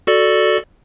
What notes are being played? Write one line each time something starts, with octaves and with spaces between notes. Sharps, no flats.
F#4 A4 D5